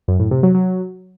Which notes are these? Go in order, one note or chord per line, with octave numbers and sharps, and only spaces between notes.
F#2
A2
C3
F#3
F#3